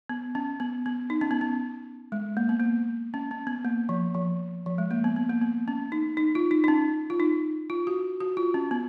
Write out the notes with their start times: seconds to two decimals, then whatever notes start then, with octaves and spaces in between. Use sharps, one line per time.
0.09 B3
0.35 C#4
0.60 B3
0.86 B3
1.10 D#4
1.21 C#4
1.31 B3
1.41 C#4
2.12 G#3
2.37 A#3
2.49 B3
2.60 A#3
3.14 C#4
3.31 C#4
3.47 B3
3.65 A#3
3.89 F3
4.14 F3
4.66 F3
4.78 G#3
4.91 A#3
5.04 B3
5.16 B3
5.30 A#3
5.42 B3
5.68 C#4
5.92 D#4
6.17 D#4
6.35 F4
6.51 D#4
6.64 D#4
6.68 C#4
7.10 F4
7.20 D#4
7.70 F4
7.87 F#4
8.21 F#4
8.37 F4
8.54 C#4
8.71 B3